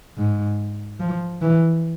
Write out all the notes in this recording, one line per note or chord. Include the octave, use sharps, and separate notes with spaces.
G#2
F3
E3